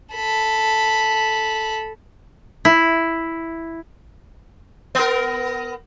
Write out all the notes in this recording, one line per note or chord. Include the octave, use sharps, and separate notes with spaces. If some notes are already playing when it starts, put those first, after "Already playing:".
A4 B5
E4
B3 A#4